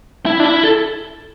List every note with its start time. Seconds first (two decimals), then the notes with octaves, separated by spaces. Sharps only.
0.26 E4
0.40 D4
0.44 E4
0.63 A4